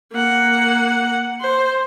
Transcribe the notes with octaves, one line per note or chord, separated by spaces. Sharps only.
A#3 F#5
C5